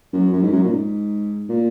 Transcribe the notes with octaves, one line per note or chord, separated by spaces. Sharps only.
F#2
F#2
G#2
F#2
A#2
G#2
A#2